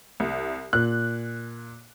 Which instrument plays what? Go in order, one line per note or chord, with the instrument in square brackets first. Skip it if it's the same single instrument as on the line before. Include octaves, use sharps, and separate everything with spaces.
[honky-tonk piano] C2
[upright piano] A#2 [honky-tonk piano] F#6